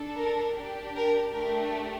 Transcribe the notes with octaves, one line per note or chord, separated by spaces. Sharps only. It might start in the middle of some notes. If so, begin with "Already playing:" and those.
Already playing: D4 A4
A#4
D4 G4
A#4
A3 D4 G4 A#4